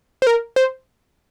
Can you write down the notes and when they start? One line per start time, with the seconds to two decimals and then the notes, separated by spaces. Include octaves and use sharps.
0.22 C5
0.27 A#4
0.56 C5